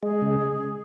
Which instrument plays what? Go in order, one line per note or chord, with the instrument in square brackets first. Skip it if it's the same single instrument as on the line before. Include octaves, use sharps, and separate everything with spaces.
[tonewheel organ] G#3 [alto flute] G#4
[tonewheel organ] C#3